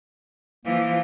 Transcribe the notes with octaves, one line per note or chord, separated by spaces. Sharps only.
E3 F3 A#3